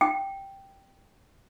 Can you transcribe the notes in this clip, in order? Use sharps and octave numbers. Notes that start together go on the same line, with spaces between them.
G5